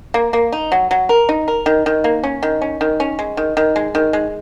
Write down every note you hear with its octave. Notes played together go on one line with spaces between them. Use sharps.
A#3
A#3
D#4
F#3
F#3
A#4
D#4
A#4
D#3
D#3
A#3
C#4
D#3
C#4
D#3
C#4
G#3
D#3
D#3
G#3
D#3
G#3